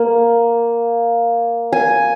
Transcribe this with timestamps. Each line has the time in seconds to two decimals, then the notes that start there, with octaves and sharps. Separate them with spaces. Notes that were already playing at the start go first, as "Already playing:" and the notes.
Already playing: A#3
1.72 G#5